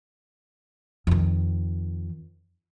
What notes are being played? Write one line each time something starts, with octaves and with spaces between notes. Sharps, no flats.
F2 D#3